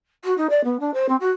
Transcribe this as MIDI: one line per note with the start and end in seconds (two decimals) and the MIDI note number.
0.24 0.36 66
0.37 0.47 63
0.50 0.61 74
0.64 0.77 59
0.80 0.93 62
0.94 1.06 72
1.08 1.16 60
1.20 1.30 66